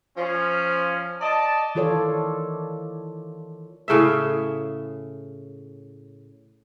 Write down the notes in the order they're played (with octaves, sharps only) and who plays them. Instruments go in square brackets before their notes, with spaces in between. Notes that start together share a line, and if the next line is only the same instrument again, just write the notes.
[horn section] F3 C#4
D5 D#5 A5
[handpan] D#3 E3 F4 A4 C#5 D5
[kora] A2 C#3 G#4 E5